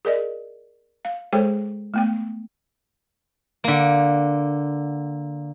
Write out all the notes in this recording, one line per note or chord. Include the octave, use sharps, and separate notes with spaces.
G#4 A#4 D5 D#5
F5
G#3 G#4 A4 C5 C#5 G5
A3 B3 G5
D3 A#3